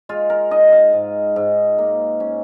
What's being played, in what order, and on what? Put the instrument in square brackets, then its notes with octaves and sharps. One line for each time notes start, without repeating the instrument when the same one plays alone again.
[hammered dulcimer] G#3 F4
A#4
D#4 D#5
F5
G#2
G#2
A#3
C#4